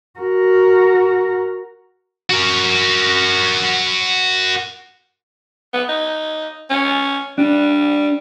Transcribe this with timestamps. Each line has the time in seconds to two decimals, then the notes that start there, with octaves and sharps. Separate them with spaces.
0.20 F#4 A#4
2.30 F#4 A#4
5.73 B3
5.89 D#4
6.70 C#4
7.38 G3 D4